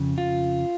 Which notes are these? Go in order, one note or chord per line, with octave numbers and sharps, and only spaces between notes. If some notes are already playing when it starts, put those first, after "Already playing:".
Already playing: F2 C#3
F4